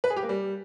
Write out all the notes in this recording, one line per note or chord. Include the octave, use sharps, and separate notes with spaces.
B4
G#4
G4
A#3
G3